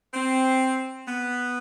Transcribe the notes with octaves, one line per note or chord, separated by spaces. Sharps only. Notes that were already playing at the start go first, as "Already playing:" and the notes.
C4
B3